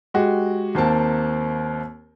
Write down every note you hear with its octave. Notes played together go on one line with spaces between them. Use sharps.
G#3 F#4 G4
D#2 A#3 C4 A5